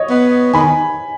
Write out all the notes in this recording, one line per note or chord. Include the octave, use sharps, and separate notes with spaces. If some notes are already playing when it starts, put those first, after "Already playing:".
Already playing: C#5 D#5
B3
D#3 G#5 B5